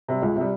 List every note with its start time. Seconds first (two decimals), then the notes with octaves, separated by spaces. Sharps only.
0.08 C3 G3
0.22 C#2
0.36 C3
0.41 G3